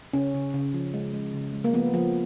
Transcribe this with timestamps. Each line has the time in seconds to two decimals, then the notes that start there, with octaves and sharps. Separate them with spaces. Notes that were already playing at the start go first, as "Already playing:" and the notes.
0.13 C#3 C#4
0.34 C#3
0.54 C#3
0.74 F3
0.94 G#3
1.13 G#3
1.34 C#3
1.53 G#3
1.64 A#3
1.74 F3 B3
1.94 F3